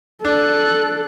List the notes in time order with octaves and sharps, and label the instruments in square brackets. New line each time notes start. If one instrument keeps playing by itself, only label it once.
[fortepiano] D4 [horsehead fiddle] A4 [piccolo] F#6